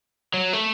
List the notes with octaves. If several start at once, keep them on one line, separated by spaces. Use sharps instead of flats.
F#3
A3